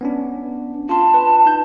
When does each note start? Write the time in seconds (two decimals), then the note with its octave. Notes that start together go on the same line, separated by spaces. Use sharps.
0.01 B3 C#4 D4
0.89 F4 A5 C6
1.14 B4
1.46 D#4 G6